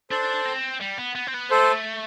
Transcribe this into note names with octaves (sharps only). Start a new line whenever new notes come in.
D4 A4 C5
C4
G3
B3
B3
C4
B3
A3 A4 C5